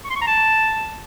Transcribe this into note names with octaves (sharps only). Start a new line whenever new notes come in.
C#6
C6
C#6
A#5
A5